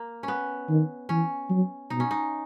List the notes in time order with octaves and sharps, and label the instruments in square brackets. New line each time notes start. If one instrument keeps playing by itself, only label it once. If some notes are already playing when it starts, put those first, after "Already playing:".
Already playing: [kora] A#3
B3 C#4
[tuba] D#3
[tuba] E3 [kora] C#4
[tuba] F#3
[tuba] B2 [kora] D#4
[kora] C#4
D#4